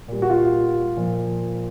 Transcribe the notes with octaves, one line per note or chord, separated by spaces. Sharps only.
A#2 G3
F#4
F4
A#2 F3